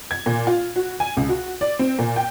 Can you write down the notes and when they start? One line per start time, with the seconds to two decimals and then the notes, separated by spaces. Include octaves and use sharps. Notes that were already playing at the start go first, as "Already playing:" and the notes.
0.11 G#6
0.26 A#2
0.47 F4
0.76 F#4
1.00 G#5
1.17 C#2
1.29 F#4
1.61 D5
1.79 C4
1.99 A#2
2.16 G5